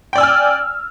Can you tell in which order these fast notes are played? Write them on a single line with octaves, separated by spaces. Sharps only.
G5 D5 E6 G#5 F6